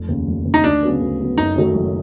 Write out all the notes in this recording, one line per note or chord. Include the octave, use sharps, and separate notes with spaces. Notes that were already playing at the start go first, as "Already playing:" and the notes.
Already playing: F1
D#2 C#3
F1
D#2 C#3
D#4
D2 D4
C#3 F#3 B3
D2
C#3 F#3 B3
F#1 D#4
F#2 D#3 F#3 A3
F#1